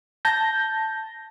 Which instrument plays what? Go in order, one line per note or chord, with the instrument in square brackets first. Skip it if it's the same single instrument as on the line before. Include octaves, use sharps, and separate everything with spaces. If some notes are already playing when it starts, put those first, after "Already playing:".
[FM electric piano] A5 G6 A#6